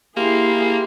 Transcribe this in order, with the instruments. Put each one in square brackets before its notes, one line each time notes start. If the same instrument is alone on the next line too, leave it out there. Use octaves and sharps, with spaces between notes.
[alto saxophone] A#3 [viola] E4 G#4 [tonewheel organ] G4 C6